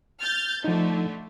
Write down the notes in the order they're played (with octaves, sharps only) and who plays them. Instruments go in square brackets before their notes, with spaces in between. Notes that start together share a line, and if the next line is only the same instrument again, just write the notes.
[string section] F6 G6 A6
[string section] D3 A3 [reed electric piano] F3 D#4